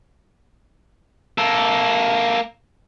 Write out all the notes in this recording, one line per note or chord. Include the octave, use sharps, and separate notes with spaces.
A#3 A4